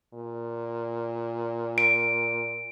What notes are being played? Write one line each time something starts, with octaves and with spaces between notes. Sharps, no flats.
A#2
D7